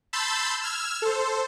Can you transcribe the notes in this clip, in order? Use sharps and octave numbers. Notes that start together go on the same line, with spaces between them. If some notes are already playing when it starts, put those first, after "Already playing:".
A5 B5 C6 E6 G6 A6
E6 F6 G#6
A4 C5